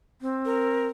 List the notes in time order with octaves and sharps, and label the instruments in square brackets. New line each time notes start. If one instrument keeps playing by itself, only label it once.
[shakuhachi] C4
[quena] A#4